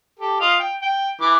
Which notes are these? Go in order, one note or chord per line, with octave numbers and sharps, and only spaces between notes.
G4 A4
F4 D#5 F5
G5
G5
E3 D6